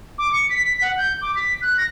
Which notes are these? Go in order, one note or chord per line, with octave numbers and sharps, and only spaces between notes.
D6
C#7
B6
B6
F#5
G6
D6
B6
F#6
A#6